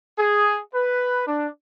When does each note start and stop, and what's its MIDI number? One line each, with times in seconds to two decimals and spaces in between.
0.18 0.57 68
0.74 1.22 71
1.27 1.48 62